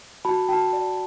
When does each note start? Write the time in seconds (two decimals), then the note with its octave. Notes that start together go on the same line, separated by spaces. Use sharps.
0.25 F#4 A5 B5
0.49 F#4 G5 A5
0.73 D5